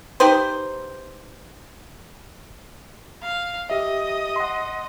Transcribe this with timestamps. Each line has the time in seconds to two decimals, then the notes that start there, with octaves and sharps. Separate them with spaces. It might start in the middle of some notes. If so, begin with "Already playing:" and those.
0.20 D#4 G4 B4 C5
3.22 F5
3.70 G4 D#5 E5
4.36 F#5 C6